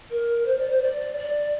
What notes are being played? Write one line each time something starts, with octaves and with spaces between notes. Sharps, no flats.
A#4
C5
D5
C5
D5
D5